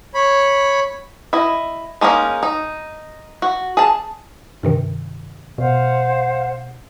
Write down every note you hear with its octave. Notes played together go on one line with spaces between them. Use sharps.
C#5 B5
E4 D#5
G#3 A#3 C#4 D#4
D#4
F#4
G#4 A5
G2 C3 D#3
B2 C5 F5 F#5